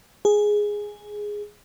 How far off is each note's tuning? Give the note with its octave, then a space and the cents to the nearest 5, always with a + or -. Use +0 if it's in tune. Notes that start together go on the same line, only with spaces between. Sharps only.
G#4 +0